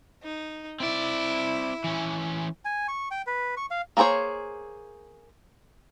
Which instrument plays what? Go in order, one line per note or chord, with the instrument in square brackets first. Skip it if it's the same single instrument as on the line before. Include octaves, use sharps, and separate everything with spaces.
[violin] D#4
[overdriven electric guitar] C4 D5 [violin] E4
[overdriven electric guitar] E3 C#4
[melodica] G#5
C#6
G5
B4
C#6
F5
[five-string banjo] A#3 D4 G#4 C5 C#5